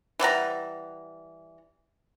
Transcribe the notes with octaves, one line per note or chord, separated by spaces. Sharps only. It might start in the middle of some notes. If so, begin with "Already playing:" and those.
E3 G3 F#5 A#5